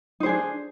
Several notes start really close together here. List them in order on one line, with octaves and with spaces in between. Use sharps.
D#4 C5 G#4 D4